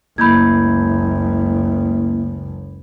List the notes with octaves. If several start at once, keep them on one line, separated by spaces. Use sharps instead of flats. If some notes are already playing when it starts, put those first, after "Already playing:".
F#1 C#2 A3 A#3 E4 B5 G6 G#6